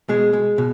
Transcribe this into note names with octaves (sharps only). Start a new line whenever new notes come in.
B2 G#3 G#4
G#3
B2